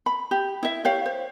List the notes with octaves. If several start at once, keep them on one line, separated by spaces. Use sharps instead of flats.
B5
G4
E4 E5
G4 C#5 F5
C5